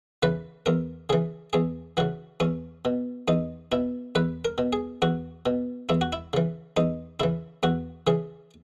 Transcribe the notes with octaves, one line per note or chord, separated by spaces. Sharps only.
C#3 E3 B4
E2 A#4
C#3 E3 G#4
E2 G#4
C#3 E3 F#4
E2 C#4
B2
E2 D#4
B2 E4
E2 B4
A#4
B2
G#4
E2 F#4
B2
E2 E4
F#4
E4
C#3 E3
E2 D#4
C#3 E3 E4
E2 F#4
C#3 E3 G#4